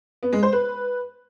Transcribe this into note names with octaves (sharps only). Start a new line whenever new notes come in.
B3
G#3
C5
B4